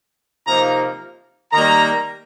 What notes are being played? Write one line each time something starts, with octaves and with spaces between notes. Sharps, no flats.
C3 F3 A#3 D#4 A#5
D#3 G3 A#3 A#5